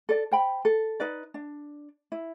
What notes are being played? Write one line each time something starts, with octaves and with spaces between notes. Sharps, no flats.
A4 D5
C5 G5 B5
A4
D#4 B4 D5
D4
E4